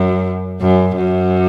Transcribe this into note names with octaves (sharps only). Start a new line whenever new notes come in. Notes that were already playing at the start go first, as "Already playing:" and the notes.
Already playing: F#2
F#2
F#2